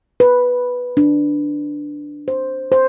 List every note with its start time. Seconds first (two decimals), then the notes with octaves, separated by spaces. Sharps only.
0.20 B4
0.97 D4
2.28 C5
2.72 C5